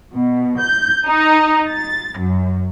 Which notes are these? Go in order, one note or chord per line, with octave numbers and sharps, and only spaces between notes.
B2
G6
D#4
A6
F#2